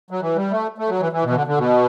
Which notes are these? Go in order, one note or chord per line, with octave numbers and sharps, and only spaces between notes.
F#3
E3
G3
A3
A3
F#3
E3
E3
B2
E3
D3
D3
B2